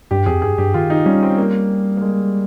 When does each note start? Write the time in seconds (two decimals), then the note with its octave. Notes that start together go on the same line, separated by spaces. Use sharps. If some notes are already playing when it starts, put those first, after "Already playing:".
0.11 G2 G4
0.26 F2 G#4
0.42 G2 G#4
0.58 G2 G4
0.74 D#3 F4
0.90 D#4
1.06 G3 C#4
1.23 C4
1.38 A#3
1.97 A#3
2.02 G#3